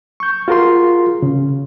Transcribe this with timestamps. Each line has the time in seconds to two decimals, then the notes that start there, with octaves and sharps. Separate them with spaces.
0.20 C#6 G6
0.48 F4 F#4 G#4 A#4 F5 C6
1.22 C#3